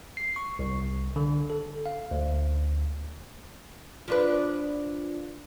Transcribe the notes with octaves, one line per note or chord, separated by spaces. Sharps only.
C7
C#6
C2
D3
A4
F5
D2
F3 D4 B4